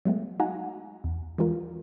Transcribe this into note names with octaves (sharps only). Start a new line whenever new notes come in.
F#3 G#3 A3 B3
D#4 F#4 F5 F#5 G#5 A#5
E2
E3 G3 G#3 F4 A#4